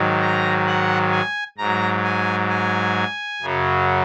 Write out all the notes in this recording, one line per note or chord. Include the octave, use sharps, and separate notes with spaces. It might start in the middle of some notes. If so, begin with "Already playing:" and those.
Already playing: G#2 D#3 F#3
A#5
F#5
G#5
G#2 F#3 A#5
G#5
G#5
F#2 C#3 F#3